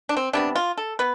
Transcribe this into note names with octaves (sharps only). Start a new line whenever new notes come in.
D4
C4
C3 G3 B3 D4
F4
A4
B3 B4